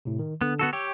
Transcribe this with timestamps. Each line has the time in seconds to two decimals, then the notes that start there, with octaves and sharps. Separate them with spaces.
0.05 A2 C3
0.19 D#3
0.41 D3 B3
0.59 B3 F#4 A4
0.73 G4 C#5 G5 E6